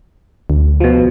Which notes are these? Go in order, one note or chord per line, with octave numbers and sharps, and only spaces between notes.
D2
B2 F3